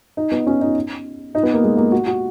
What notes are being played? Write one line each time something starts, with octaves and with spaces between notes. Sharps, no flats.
D#4
B3
C#4
D#4
D#4
B3
A#3
G#3
A#3
F#4
F#4